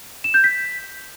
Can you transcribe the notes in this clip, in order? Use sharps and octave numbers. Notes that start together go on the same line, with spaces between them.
E7
G6
B6